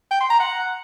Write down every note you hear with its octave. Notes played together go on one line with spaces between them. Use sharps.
G5
C6
A#5
F#5